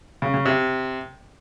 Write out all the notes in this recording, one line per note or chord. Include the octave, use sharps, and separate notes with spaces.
C#3
C#3
C3